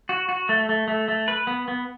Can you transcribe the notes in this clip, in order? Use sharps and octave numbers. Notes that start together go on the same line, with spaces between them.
F#4
F#4
A3
A3
A3
A3
B4
B3
B3